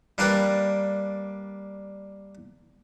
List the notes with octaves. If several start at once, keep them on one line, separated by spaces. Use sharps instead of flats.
G3 A#3 D4 A#4 B4 G5